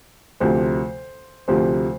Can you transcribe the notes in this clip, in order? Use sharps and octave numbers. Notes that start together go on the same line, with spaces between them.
D2 C3 F3 C5
D2 C3 F3 C5